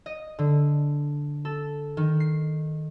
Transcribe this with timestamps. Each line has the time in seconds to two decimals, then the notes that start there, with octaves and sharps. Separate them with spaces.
0.06 D#5
0.39 D3
1.45 A4
1.97 D#3
2.20 C7